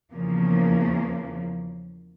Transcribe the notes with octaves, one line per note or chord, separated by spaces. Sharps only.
E2 C#3 F3 A#3